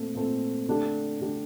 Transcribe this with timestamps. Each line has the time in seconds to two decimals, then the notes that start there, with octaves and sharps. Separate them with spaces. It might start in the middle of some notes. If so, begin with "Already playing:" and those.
Already playing: A#2 A3 C4
0.15 A#2 A3 C4
0.68 D3 A3 D4 G4
1.21 D3 A3 D4 G4